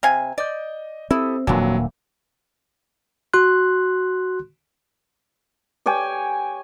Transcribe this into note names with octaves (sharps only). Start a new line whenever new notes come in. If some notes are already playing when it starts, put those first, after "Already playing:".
C3 F5 G#5
D5 D#5 G6
C4 E4 G4 A4 D#6
D#1 F2 A#2 E3 F#3 A#3 D4
F#4 C6 F#6
G4 C#5 G5 G#5